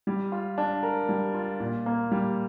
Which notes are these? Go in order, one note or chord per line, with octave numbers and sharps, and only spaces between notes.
G3
F4
D4
A#4
G3
F4
A#2
A#3
G3